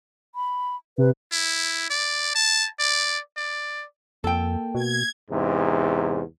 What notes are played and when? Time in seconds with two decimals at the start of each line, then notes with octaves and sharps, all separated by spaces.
0.35 B5
0.98 C3 B4
1.32 E4
1.90 D5
2.35 A5
2.79 D5
3.37 D5
4.24 F2 A#3 A4 G5
4.75 B2 G#6
5.31 E2 G#2 C3